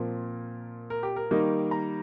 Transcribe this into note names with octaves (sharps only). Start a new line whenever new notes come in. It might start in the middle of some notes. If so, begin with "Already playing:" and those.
Already playing: A#2 F3 C4 A#4
A#4
G4
A#4
D#3 G3 A#3 D#4
A#5